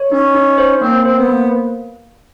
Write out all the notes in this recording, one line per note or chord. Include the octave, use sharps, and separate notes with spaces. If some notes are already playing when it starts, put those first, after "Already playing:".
Already playing: C#5
C#4 D#4
D#4
C5
A#3 C4
C4 C5
B3
A#3